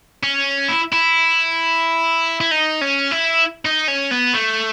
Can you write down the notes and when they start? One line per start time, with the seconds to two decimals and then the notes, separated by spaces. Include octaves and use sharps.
0.23 C#4
0.68 E4
0.92 E4
2.41 E4
2.51 D#4
2.82 C#4
3.12 E4
3.65 D#4
3.88 C#4
4.11 B3
4.33 A3